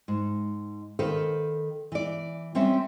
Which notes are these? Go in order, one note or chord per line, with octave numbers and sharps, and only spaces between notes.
G#2
D#3 A4 B4 C5 F5
E3 D5
G3 C4 C#4 E4 E5